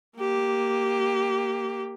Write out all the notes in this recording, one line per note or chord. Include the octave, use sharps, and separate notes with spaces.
A#3 G4